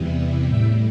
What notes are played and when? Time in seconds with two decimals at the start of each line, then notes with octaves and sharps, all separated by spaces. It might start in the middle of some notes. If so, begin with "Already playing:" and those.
Already playing: E2 C3 E3 G3
0.45 A2 G3 E5 G5